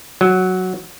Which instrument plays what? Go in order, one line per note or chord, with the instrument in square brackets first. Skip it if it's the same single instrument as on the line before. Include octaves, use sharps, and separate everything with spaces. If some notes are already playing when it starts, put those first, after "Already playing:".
[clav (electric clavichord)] F#3